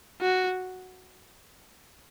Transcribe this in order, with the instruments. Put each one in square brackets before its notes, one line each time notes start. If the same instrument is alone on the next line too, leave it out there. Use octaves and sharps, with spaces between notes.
[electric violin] F#4